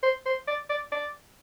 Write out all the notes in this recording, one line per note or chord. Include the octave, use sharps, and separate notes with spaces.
C5
C5
D5
D5
D5